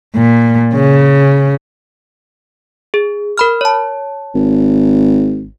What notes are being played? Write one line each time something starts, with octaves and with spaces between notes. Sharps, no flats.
A#2
C#3
G#4
A#4 B5 F6
C#5 A5
G#1